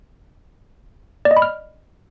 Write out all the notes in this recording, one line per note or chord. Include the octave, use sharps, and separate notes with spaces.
D5
D#5
B5
F6